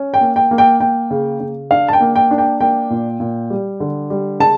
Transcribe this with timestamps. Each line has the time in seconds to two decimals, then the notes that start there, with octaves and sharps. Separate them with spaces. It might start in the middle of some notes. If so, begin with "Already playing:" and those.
Already playing: C#4
0.14 G5
0.21 A#3
0.36 G5
0.51 A#3
0.58 G5
0.80 A#3 G5
1.11 C#3
1.40 C#3
1.71 D4 F5
1.88 A5
1.93 G5
2.01 A#3
2.16 G5
2.31 D4
2.38 G5
2.60 A#3 G5
2.90 A#2
3.20 A#2
3.50 G3
3.80 D3
4.10 G3
4.39 C#3 A5